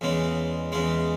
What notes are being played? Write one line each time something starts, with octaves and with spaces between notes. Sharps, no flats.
E2 C#3 G#3
E2 C#3 G#3